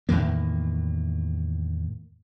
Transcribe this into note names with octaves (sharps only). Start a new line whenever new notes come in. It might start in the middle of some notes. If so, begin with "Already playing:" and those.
E2 A2 D#3 A#3